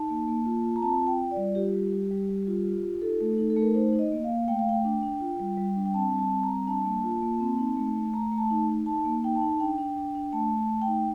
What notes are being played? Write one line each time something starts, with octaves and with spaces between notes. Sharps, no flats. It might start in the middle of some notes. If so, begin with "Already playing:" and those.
Already playing: D#4 A5
A#3
A#3
F4
F4
A#5
C4 A5
F4
G5
F4
D5
G3
F4 G4
G3
G3
G3
G3
F4
F4
F4
D#4 A4
A3
D#4
A4
A3
A#4
D#4 C5
D#4
D#5
A#3
F5
A#3
A3 G5
F5
A3 G5
D4
D4
F4
G3
G3
D4
G5
C4 A5
G3
A5
C4
A#5
G3
D4 A5
A#3
F4
A#3
C4
D#4
A3
A3
A3 A#5
A3
A5
D#4
D#4
D#4 A5
A#3
D#4 G5
A5
D#4
D4 G5
D4
D4
D4
A3 A5
A3
A5
A3
G5
D#4